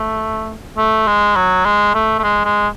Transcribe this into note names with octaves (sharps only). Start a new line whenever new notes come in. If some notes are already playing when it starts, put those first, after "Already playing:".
Already playing: A3
A3
G#3
F#3
G#3
A3
A3
G#3
G#3